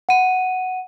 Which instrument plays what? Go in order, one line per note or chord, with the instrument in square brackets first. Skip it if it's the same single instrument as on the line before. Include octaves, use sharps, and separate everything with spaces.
[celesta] F#5 D#7